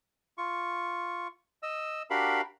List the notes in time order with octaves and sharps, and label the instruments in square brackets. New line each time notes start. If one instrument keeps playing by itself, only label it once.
[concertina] F4 C#6
D#5 E6
D4 F#4 G4 A#4 F5 B5